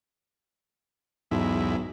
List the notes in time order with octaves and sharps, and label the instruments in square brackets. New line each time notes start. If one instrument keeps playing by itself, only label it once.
[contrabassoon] B1 [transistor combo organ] E2 G#2 E4